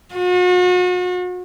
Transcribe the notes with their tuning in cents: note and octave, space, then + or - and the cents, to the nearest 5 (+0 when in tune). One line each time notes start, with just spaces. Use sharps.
F#4 -40